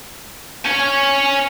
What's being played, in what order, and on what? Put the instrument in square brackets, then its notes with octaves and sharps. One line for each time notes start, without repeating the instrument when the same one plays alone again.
[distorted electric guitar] C#5 G#5